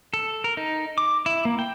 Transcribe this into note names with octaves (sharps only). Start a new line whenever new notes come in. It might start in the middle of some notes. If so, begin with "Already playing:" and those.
A4
A#4
D#4
D6
E4
A#3
G5